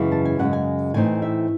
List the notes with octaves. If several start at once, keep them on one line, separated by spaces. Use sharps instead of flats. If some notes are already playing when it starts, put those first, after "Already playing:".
Already playing: F#2 C#3 E3 G#3
A5
G#5
F#2 C#3 G#3 F#5
G#5
A2 E3 C4 D#4 G#5
E5